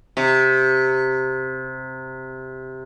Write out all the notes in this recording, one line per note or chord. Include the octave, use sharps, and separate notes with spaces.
C3